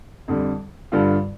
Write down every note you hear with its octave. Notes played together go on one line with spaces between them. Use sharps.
F2 D3 G3
G2 D3 G3 D4 F4